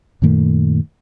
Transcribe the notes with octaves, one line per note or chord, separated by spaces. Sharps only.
F#2 A#2 D#3 A3